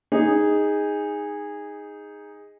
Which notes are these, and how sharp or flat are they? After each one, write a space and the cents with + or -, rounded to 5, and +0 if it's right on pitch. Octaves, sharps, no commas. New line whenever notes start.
D#4 +0 G#4 -15